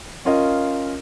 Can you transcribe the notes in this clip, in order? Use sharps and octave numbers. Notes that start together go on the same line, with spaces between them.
C#4 F4 A#4 D#5 F5